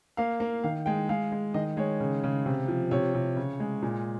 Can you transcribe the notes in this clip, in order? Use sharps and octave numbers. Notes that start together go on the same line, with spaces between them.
A#3 F5
A#3
D#3 F5
G#3 G5
G#3 F5
G#3
D#3 D#5
G#3 C#5
C#3
C#3
C3
F3
C3 C#5
C3
C#3
G#3
A#2